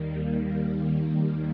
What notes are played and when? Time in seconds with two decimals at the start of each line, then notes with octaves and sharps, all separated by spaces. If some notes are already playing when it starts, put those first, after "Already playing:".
Already playing: D#2 D#3 G3 A#3
0.98 G3